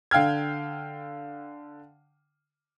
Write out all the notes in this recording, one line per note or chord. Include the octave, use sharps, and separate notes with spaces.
D3 F5 G5 F6 G#6